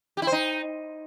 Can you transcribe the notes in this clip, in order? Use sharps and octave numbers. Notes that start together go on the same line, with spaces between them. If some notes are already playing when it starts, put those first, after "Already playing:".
G4
E4
C5
D#4